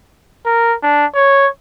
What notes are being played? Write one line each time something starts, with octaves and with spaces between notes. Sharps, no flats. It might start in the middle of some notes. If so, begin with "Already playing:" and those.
A#4
D4
C#5